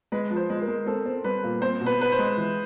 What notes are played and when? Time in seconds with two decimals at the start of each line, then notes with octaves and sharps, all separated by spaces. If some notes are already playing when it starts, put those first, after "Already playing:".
0.12 G#3 B4
0.30 F3
0.36 C5
0.50 G#3
0.62 A#4
0.68 G#3
0.86 C4 A4
1.06 C4
1.24 G3 B4
1.43 A#2
1.61 C4 C5
1.81 B2
1.86 B4
2.00 C4 B4
2.12 C5
2.19 G#3
2.37 E3